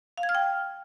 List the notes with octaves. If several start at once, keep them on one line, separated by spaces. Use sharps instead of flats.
F5
G#6
F6
G5